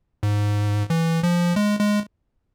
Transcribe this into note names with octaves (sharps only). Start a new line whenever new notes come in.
G#2
E3
F3
G#3
G#3